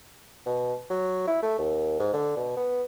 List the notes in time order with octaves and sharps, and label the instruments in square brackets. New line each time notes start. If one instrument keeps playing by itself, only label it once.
[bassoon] B2
F#3
E4
A3
D#2
G#2
D3
B2
B3